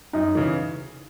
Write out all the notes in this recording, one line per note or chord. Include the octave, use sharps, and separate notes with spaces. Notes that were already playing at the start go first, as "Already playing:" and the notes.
F#2 D#4
C#3 E3